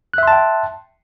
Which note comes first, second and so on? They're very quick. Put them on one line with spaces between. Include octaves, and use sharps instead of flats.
F#6 E5 C6 A5 G5